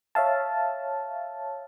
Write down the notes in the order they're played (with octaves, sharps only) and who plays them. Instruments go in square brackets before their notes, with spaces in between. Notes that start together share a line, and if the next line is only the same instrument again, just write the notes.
[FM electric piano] C#5 E5 F5 A5